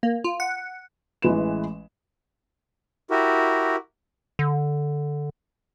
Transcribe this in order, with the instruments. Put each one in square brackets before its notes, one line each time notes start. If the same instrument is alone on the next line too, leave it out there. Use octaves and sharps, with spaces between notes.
[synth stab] A#3
F4
F#5
[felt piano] A1 E3 G#3 B4 E7
[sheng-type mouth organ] E4 F#4 G4 A#4
[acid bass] D3